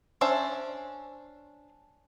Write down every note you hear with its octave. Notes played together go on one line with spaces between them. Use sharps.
C#4 D4 C5 E5 A5